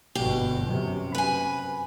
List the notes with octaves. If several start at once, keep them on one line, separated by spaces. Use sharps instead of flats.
G1 B2 G4
F#2 C3
B4 G#5